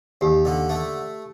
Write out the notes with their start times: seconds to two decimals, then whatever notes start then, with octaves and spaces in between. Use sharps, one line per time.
0.21 D#2 G4
0.45 D3
0.69 A3